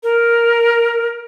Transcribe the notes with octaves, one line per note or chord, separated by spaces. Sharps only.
A#4